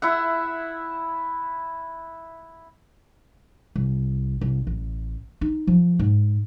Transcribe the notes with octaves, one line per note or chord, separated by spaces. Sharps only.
E4 E5 F#5
C2
C2
A1
D#4
F3
G#2